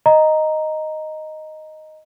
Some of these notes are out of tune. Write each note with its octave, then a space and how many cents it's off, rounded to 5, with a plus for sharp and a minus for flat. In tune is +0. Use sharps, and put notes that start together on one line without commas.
D#5 +0 A#5 +0